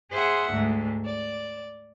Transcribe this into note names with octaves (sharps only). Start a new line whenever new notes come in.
G#4 C5 E5 F#5
D2 G#2
D5